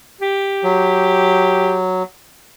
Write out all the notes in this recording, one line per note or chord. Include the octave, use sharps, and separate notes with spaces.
G4
F#3